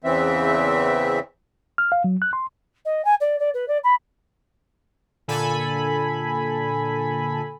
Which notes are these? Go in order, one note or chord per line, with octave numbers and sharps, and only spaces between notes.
E2 C#3 E3 C4 E5
F6
F5
F#3
F#6
C6
D#5
G#5
D5
D5
B4
D5
B5
A#2 D3 A4 G#5 B5